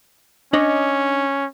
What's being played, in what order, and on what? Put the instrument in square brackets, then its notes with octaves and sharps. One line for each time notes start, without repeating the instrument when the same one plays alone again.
[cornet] C#4 [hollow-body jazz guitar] D4 C#5 D#5